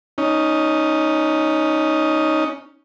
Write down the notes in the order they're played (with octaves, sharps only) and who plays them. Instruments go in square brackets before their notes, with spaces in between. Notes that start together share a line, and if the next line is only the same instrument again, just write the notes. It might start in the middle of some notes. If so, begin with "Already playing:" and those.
[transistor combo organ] C#4 D#4